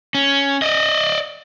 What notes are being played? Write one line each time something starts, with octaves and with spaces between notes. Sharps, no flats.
C#4
D5 D#5